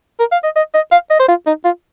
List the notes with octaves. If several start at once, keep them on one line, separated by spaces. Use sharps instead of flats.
A#4
F5
D#5
D#5
D#5
F5
D#5
C5
F4
D#4
F4